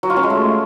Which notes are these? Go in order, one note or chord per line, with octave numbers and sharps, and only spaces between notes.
F#3
F4
C#4
G#3
A3